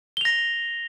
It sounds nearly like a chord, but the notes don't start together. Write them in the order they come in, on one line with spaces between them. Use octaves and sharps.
G7 F7 A#6